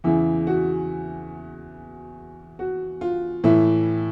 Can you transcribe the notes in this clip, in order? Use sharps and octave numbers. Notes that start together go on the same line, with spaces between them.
E2 C#3 E3 E4
F#4
F#4
F4
A2 E3 E4